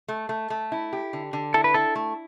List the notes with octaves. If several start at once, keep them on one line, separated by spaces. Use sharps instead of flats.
A3
A3
A3
E4
G4
D3
D3
E4 A4
B4
E4 A4
A3